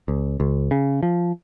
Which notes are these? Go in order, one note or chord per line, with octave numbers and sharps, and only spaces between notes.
C#2
C#2
C#3
F3